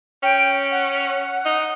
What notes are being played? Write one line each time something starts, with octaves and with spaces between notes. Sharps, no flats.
C#4 G5
F#5
D#4